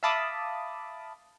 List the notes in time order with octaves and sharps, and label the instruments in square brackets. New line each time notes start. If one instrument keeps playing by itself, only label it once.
[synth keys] E5 F5 A5 B5 D6 D#6